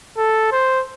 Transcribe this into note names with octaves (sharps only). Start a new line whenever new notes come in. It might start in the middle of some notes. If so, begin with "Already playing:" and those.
A4
C5